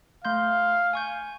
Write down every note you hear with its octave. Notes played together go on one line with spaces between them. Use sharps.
A3 F5 C6 G6
G#5 C#6 G6